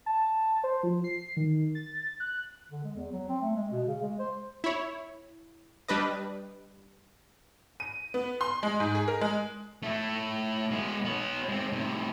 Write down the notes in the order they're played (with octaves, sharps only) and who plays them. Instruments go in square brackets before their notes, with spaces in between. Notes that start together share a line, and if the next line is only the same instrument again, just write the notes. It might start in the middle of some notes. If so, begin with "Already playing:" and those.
[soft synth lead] A5
C5
F3
C7
D#3
A6
F#6
[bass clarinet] D3
G#3
E2
F#3
C4
A3
G#3
B2
C#3
G#3
C5
[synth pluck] E4 C#5
G3 D4 B4 D#5
[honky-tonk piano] D#7
B3
C6
G#3
G#2
G#4
A#4
G#3
[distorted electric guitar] A3 E4
G#3 B3
B3 C#5
G#3 C4
A2 C3